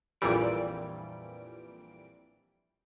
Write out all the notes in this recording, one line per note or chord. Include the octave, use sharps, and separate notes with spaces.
A#1 F2 A#2 E3 G3 D7